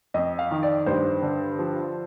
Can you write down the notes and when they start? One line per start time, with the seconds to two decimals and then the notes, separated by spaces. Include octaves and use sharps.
0.14 F2 D#5
0.39 F5
0.51 D#3
0.63 D5
0.86 G2 C5
1.22 D3
1.59 F3